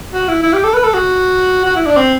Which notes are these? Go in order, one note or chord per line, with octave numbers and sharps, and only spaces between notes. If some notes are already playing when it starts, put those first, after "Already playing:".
F#4
E4
E4
G4
A4
B4
A4
F#4
F#4
E4
D4
C4